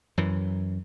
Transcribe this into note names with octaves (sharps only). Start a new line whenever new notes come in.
F#2 E3